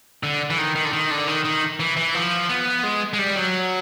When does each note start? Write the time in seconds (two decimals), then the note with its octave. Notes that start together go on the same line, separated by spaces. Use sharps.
0.23 D3
0.50 E3
0.58 D#3
0.75 D#3
0.85 D3
0.93 D#3
1.11 D3
1.27 D#3
1.44 D#3
1.80 E3
1.97 E3
2.14 F3
2.49 B3
2.83 G#3
3.13 G#3
3.19 G3
3.36 F#3